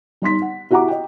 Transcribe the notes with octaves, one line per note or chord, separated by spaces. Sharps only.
G3 D#4 C6 B6
F#5
E4 F#4 G4 F#5 A#5 D6
D#5 G5